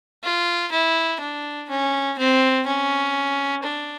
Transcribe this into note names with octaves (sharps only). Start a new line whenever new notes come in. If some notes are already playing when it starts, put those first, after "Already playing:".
F4
E4
D4
C#4
C4
C#4
D4